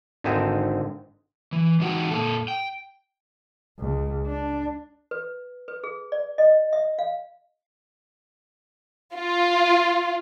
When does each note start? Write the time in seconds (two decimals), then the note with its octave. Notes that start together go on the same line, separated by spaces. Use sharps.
0.24 G#1 D3 C4 D#4 E5 G#5
1.52 E3
1.80 E3 G#3 D#4 F#4 F#5 G5
2.11 A#2 A#3 A4
2.48 G5
3.79 C#2
4.27 D4
5.11 B4
5.68 B4
5.84 G#4
6.12 D5
6.38 D#5
6.73 E5
6.99 F5
9.16 F4